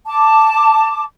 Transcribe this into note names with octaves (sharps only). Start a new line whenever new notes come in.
A5 D6